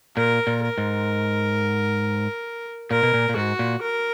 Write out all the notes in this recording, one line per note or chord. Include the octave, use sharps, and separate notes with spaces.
A#2 A#4
A#2
A#4
G#2
A#2 A#4
B2
A#2
A#2
G#2 F#4
A#2
A#4